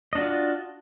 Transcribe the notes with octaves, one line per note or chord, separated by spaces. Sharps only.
D4 F4 F#4 D#5